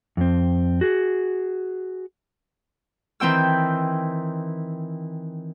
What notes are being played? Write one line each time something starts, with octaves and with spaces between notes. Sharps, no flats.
F2 C4
F#4 G#4
D#3 E3 C4 G5 E6